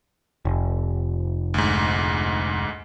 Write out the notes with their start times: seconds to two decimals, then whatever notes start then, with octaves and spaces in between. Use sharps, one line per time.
0.45 F1
1.54 D2 G#2